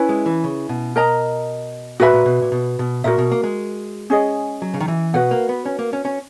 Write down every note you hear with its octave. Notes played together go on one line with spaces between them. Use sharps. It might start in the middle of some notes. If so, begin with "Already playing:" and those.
Already playing: C#4 E4 B4
G#3
E3
C#3
B2
A#4 D#5 A#5
A#2 F#4 B4 E5 B5
A#2
B2
A#2
B2
B2
A#2 F#4 A#4 E5
B2
A#3
G#3
C#4 G#4 D#5
F#3
C#3
D#3
E3
B2 F#4 B4 F#5
A#3
B3
C#4
A#3
C#4
C#4